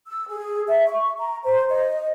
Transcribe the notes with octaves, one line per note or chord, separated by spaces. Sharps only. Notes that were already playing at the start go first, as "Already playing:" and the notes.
E6
G#4
E5
C#6
A#5
C5
D#5